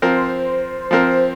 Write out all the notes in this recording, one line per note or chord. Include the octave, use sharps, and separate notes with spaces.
F3 C4 A#4 C5
F3 C4 A#4